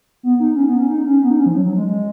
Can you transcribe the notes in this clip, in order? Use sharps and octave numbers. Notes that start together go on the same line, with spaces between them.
B3
D#4
C#4
B3
C#4
D#4
C#4
B3
D#4
C#4
F3
F#3
F#3
G#3
G#3